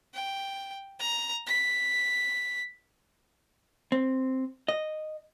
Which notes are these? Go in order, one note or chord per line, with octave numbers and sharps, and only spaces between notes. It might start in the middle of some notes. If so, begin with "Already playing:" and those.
G5
A#5
B6
C4
D#5